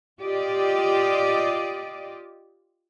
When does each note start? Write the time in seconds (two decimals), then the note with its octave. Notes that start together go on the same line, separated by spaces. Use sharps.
0.21 F4 G4 D5 D#5